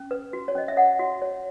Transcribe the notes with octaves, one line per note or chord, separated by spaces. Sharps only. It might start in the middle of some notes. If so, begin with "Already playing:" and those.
Already playing: C#4
B4
F#4
C#5
C#4 D#5
E5
C#5 F#5
F#4
C#5